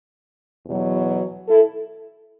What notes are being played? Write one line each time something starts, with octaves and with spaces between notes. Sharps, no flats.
E2 B2 F#3
E4 A4